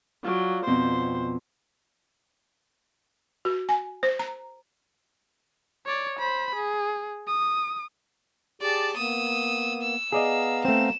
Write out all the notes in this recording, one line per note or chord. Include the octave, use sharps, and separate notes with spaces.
F#3 F4 D5
F2 B2 C4 C5
F#4
G#5
C5
A#5
C#5 D5
C5 B5
G#4
D#6
G4 G#4 D5 A5
A#3 B3 D#6 E6
E6
B3 G#4 D5 D#5 F5 A#5
A3 C4 E7